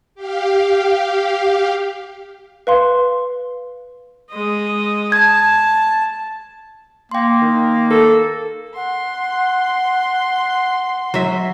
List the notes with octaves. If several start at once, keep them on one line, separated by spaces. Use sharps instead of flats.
G4 F5
B4 F5 C6
G#3 D#5
A5 G#6
A#3 G5 C6
D#3
A4 A#4
F#5 C6
F#3 E5